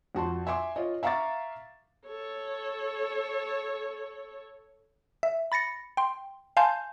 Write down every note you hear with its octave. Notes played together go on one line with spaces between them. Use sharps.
F2 F#4 A5 C6
E5 G#5 C6 D6
F4 C#5 D#5
E5 F5 A#5 C#6 D6 A6
A4 C#5
E5
B5 A6 A#6 C#7
G5 C6
F5 G#5 A5 C6 G6